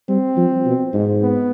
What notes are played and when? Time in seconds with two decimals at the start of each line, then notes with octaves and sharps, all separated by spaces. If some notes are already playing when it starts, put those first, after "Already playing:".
0.09 G3 C4
0.37 F3
0.65 B2
0.94 G#2
1.23 B3